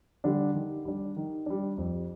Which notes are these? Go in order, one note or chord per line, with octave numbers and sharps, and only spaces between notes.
D3 G3 D4
D#3
G3 D4
D#3
G3 D4
F2